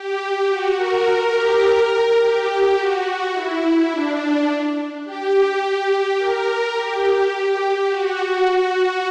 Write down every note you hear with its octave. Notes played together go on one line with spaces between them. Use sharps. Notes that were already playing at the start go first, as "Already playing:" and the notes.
Already playing: G4
G4
F#4
A#4
G4
A#4
G4
F#4
E4
E4
D4
G4
G4
A#4
G4
F#4
F#4